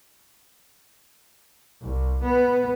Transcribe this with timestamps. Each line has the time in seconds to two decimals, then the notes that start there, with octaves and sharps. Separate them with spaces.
1.82 C2
2.22 B3